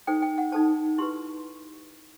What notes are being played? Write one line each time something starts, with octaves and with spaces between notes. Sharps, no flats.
D#4 A4 C5 G5
G5
F#5
D#4 A4 C5 A5
E4 G4 B4 C6